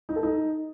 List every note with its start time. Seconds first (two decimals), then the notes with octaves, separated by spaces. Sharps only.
0.09 D#4
0.16 A4
0.23 D#4